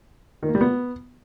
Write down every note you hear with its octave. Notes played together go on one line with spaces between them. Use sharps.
D#3
A#3
G3
B3